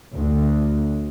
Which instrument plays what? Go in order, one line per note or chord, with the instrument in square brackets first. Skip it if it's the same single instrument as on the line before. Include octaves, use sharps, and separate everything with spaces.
[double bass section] D2